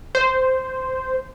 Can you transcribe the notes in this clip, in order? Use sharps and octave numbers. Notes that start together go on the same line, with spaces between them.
C5